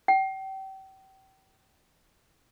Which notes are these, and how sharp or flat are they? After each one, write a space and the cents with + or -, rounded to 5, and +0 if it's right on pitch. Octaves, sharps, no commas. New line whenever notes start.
G5 -35